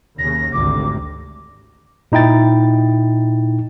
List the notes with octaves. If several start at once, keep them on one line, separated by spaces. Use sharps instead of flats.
D#2 C#3 A#6
G#1 D2 C3 D6
A#2 D#4 E4 G5 A6